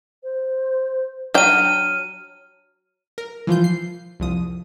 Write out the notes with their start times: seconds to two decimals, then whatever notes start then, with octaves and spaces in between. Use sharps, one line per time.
0.23 C5
1.34 F#3 D4 G5 F6 D#7
3.18 A#4
3.47 E3 F3 F4 G6
3.64 C7
4.20 C2 F2 D#6